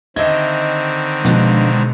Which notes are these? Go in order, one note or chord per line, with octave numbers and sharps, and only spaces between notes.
D3 D#3 C4 D#5 E5 G#6
B2 F3 G#3 D4 F4